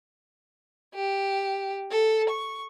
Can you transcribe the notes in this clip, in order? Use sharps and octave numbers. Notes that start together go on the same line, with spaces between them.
G4
A4
C#6